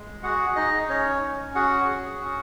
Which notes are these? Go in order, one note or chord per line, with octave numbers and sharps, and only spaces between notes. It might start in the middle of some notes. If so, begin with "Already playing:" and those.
Already playing: G#3
F#4 G#4 F#5
D#4 D#5
C#4 C#5
C#4
F#4 G#4 F#5
G#4
C#4